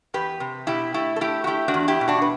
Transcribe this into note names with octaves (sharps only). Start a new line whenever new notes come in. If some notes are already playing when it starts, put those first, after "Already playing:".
E2 G4 B4
C3
B2 E4 G4
A3 E4 G4
A4
A3 E4 G4
F#4
A3 E4 G4
D4 F#4
E2
E4 G4
B2
D4 F#4
B4